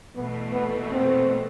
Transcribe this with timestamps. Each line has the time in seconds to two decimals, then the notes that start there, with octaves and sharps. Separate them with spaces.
0.15 E2 B2 A3 B3
0.53 B3
0.92 C4